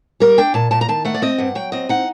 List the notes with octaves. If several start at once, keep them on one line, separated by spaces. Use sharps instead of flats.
G3 A#4
D4 G5
A#2 A5
A#2 A5
A#5
D#3 A5
A3 F#5
D5
C4 D#5
G2 F#5
F#3 G5
C4 D#5
D#4 F#5